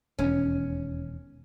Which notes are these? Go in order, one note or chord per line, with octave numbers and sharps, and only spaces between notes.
E1 D#2 C#4